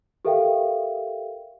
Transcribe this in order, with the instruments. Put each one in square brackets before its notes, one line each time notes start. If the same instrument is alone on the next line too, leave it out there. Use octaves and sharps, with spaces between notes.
[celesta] G4 A4 A#4 E5 F5 G5